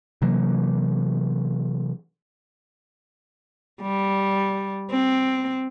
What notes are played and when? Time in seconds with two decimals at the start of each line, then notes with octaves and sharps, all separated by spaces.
0.22 C3 E3 F#3 A#3
3.82 G3
4.91 C4